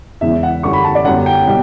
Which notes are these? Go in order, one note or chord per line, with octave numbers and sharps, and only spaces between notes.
E1 E2 C#3 E3 E5
F#5
F#2 D3 G3 C#6
B5
A5
D5
G1 F#2 D3 G3 F#5
G5
B2 G3